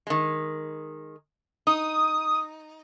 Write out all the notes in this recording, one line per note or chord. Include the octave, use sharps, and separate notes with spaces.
D#3 G#3
D#4 D#6